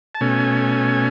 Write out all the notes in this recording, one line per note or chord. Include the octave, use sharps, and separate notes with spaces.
A5
B2 A3 C#4 G#5